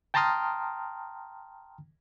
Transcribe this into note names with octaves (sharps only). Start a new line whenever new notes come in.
G5 A5 A#5 C6 D#6 F6